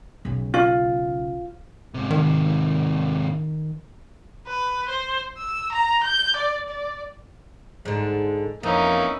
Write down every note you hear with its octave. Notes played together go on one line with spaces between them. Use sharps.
B1 C#3
F4
G#2 C3
D#3
B4
C5
E6
A#5
G6
D5
D5
G#2 D3 G#3
F2 E3 A#3 C#4 D#4